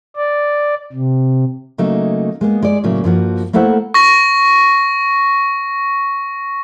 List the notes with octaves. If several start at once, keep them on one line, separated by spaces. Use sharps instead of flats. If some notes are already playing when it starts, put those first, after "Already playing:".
D5
C3
C#3 F#3 A3 A#3 D#4
G#3 A#3 B3
G#3 D5
A2 C#3 F#3 A#3
G2 F3 A#3 F#4
A3 A#3 E4 A4 C5 F#5
C#6 A#6